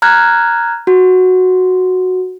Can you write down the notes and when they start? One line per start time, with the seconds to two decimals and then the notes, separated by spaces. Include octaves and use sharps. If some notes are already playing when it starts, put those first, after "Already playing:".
0.02 A#5 F6 F#6 G#6
0.87 F#4